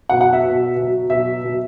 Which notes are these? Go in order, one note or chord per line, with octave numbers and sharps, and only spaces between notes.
B2 F#3 F#5
F#5
E5
B2 F#3
B2
F#3
B2 F#3 E5
B2 F#3